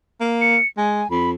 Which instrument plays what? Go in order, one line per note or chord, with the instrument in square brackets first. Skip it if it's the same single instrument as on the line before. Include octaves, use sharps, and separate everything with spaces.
[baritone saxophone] A#3
[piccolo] C#7
[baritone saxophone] G#3 [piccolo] G#5
[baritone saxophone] F2 [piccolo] B5